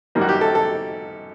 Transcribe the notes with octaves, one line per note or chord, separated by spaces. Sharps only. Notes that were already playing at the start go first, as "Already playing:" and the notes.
F#2 D#3 G3 A#3
F#4
G4
A4
A4